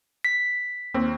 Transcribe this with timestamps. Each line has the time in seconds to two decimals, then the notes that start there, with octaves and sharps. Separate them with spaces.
0.25 B6
0.94 D#2 C4